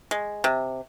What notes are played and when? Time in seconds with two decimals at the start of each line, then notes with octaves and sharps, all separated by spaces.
0.11 G#3
0.44 C3